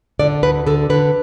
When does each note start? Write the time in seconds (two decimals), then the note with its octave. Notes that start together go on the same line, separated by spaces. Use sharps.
0.19 D3 D5
0.43 D2 B4
0.66 D3 A4
0.90 D3 B4